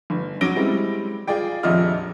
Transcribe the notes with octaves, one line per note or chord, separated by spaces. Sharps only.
G1
F#3 C#4 D6 A#6 D7 G7
G3 G#3 C4 E4 G4
F4 G#4 D5 G5
D#1 A#1 F2 D#5 E5 F6